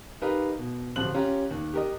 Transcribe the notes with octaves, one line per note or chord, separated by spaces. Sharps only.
D#4 G4 A#4 B4 F5 A#5
B2
D1 C3 F3 C5 F#6 F#7
C#4 F4 G4 A#5
D#2
G4 A#4 D#5